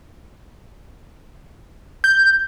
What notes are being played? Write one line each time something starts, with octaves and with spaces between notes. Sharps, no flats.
G6